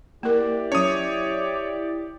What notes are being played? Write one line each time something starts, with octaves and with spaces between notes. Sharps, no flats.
A#3 E4 G4 A#4 D5
F#3 C#4 C#5 D#6